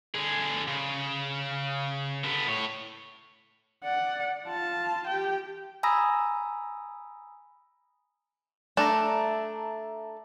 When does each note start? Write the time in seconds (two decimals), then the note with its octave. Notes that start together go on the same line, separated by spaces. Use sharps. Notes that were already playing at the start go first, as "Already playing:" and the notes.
0.14 D3 G#4
0.67 C#3
2.24 D3 B3
2.47 A2 C#5
3.84 D5 F#5
4.48 F4 A5
5.07 G4 G5
5.83 G#5 A#5 B5 D#6 E6 A#6
8.77 A3 D4 E5 A5 A#5